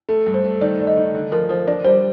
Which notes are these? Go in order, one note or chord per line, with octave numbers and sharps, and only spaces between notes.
A3 A4
G2
C5
A3
D#3 D5
A3
D#5
D#3
D3
F3 A#4
F3 C5
D4 D5
G3 C5